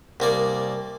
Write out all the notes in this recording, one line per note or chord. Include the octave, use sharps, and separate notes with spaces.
C2 A#3 D5